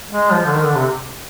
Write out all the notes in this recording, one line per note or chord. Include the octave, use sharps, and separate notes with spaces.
G#3
F3
D3
D#3
D3
C3